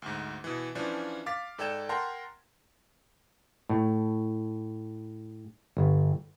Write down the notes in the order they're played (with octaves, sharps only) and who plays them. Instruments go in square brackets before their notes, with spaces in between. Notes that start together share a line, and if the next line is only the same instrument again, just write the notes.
[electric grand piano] D2 G#2
B2 E3
E3 F3 C#4 D4
F5 D6 A6 B6
G#2 A4 D5 G5 G#6 E7
A#4 F#5 G5 A5 A#5 C6
[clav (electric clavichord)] A2
G1